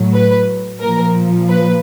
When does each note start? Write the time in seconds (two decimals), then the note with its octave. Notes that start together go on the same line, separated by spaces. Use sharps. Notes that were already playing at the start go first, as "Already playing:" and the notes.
Already playing: A2 F#3
0.13 B4
0.81 A#2 F3 A#4
1.48 B4